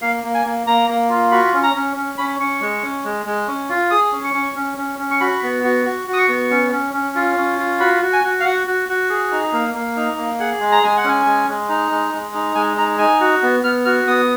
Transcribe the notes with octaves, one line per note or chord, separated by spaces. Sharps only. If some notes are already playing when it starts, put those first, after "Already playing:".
A#3 F5
A#3
G#5
A#3
A#3 A#5
A#3
F4
F#4 B5
C#4
A#5
C#4
C#4
C#4 B5
C#4 C#6
G#3
C#4
G#3
G#3
C#4
F4
G#4 D#6
C#4
C#6
C#4
C#4
C#4
C#4
C#6
F#4 B5
B3
F#4
F#4
F#4
D#6
C#6
B3
C#4
C#4
C#4
F4
C#4
F4
F#4 B5
F#4
G#5
F#4
F5
F#4 F#5
F#4
F#4
G#4
D#4
A#3
A#3
D#4
A#3
G#4 F#5
G#3
A#5
G#3 G#5
F#5
C#4 G#5
G#3
G#3
D#4
G#3
G#3
D#4
G#3 G#5
D#4 A#5
D#4 G#5
F#4
B3
B3 F6
F#4 F6
B3 D#6